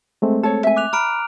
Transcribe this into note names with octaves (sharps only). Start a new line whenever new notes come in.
G#3 A3 C4
A4 C#5
E5 G#5
D6 F#6 F7
A#5 B5 F6 D7